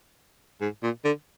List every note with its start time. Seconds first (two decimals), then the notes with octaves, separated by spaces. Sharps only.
0.61 G#2
0.83 A#2
1.05 D3